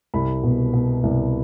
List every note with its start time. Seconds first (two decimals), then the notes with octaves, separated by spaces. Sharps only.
0.14 C2 B5
0.43 B2
0.73 B2
1.03 C2